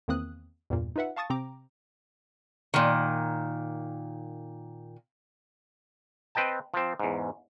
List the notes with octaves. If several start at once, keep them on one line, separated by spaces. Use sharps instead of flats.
E2 D#3 A#3 C4 D#6 F#6
E2 G2 A#2
D#4 F4 B4 E5 F#5
F5 A5 C#6 D#6 A6
C3 C4 G5 A#5 D6
A#2 D#3
C4 B4 D#5 G5 A5
F3 C4
E2 G#2